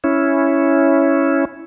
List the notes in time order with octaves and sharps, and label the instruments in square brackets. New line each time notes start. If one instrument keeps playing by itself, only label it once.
[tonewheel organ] C#4 E4